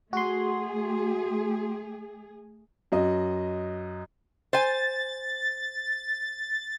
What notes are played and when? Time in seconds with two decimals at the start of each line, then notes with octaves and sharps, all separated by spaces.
0.13 A3 F#4 G#4 C6
2.92 F#2 F#4 D#5
4.53 C5 G#5 A6